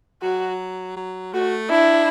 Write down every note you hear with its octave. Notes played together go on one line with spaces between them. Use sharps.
F#3 F#4
F#3
A3 F#4
D4 E4